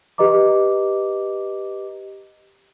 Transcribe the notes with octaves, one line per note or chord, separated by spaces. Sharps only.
G4 B4 D#5 A#5 D6